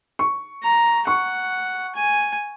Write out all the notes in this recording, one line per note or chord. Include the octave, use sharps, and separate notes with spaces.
C#6
A#5
F#5 C#6
G#5